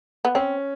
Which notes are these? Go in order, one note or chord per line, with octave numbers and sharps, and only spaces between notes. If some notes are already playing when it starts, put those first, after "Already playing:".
B3
C4 C#4